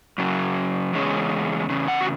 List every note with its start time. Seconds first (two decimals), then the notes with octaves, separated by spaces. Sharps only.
0.18 F#2 C#3 F#3
0.93 E2 C#3 G#3 C#4
1.69 E2 C#3
1.88 F#5
2.01 F#4